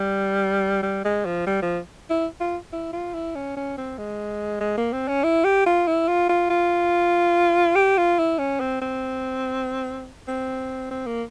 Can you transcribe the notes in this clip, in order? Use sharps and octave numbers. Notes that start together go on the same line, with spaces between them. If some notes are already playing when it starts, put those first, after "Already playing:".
Already playing: G3
G3
G#3
F3
G3
F3
E4
F4
E4
F4
E4
C#4
C#4
C4
G#3
G#3
A#3
C4
C#4
E4
G4
F4
E4
F4
F4
F4
G4
F4
E4
C#4
C4
C4
C4
C4
A#3